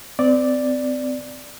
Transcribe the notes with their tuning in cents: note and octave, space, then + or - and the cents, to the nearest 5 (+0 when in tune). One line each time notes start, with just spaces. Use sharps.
C4 -30 D5 +0